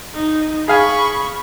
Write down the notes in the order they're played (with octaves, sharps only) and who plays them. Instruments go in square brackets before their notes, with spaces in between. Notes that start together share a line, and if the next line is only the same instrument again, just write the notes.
[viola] D#4
[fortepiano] G#4 F5 G#5 [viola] B5 C#6